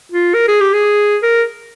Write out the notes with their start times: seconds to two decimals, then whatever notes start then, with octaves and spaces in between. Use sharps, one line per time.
0.12 F4
0.34 A#4
0.48 G#4
0.61 G4
0.73 G#4
1.23 A#4